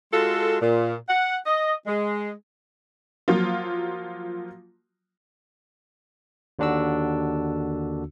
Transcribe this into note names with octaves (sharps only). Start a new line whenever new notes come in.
G#3 F4 F#4 A4
A#2
F#5
D#5
G#3
F3 F#3 A#3 F4
D#2 D3 D4 F#4 E6